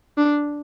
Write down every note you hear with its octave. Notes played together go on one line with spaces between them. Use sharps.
D4